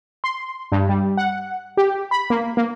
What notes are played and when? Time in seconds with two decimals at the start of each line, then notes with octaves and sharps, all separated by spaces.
0.24 C6
0.72 G2
0.89 G3
1.17 F#5
1.77 G4
2.11 B5
2.30 A#3
2.57 A#3